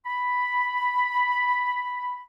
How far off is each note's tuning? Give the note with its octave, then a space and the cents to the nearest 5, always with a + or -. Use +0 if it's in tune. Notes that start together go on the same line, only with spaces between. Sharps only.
B5 +0